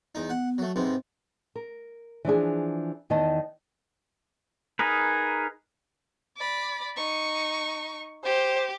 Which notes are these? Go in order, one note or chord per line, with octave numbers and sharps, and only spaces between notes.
E2 D#4
B3 F#5
F#3 A3
G#2 C3 B3 C4
A#4
E3 F3 D4 G#4
E2 D#3 B3 E4 D#5 A5
D#4 G#4 A#4 B4
D5 B5
D#4 C#6
G4 C5